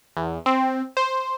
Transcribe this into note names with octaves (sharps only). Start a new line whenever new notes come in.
E2
C4
C5